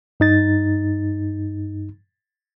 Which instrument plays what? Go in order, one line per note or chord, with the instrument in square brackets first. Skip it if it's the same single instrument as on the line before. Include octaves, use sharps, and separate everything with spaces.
[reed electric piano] G2 D#4 A6